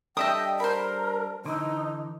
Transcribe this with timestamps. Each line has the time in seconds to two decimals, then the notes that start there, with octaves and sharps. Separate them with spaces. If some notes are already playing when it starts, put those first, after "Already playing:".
0.17 G3 D4 A4 D#5 E5 G5 D#6
0.60 A#4 C5 B5
1.45 D3 E3 D#4